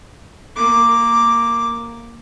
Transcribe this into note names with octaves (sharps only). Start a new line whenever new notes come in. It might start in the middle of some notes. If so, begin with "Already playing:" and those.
A#3 D6